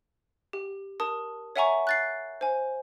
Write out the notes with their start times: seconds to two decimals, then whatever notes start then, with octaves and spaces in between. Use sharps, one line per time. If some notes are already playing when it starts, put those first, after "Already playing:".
0.53 G4
1.00 A#4 A5 D#6
1.56 C#5 E5 F#5 G#5 A#5 C#6
1.87 F#6 A6 C7
2.41 C5 G#5